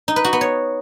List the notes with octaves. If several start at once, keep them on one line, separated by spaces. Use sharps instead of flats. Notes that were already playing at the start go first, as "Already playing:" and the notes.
D#4
B4
F#4
B3
C#5